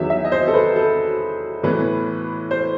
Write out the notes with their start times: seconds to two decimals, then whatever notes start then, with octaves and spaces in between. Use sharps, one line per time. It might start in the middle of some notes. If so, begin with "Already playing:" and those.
Already playing: E2 D#3 F#3 E5
0.10 E5
0.25 D#5
0.32 C5
0.48 A4
0.54 B4
0.76 A4
1.63 A2 E3 B3 B4
2.51 C5